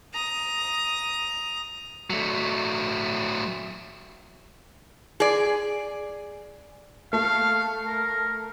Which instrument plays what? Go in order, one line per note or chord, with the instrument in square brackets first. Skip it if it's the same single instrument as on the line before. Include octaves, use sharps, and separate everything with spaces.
[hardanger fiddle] A#5 D#6
[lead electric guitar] F#3 A3
[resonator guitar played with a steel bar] G#4 D5
[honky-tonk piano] A3 [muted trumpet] F5
[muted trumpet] A#4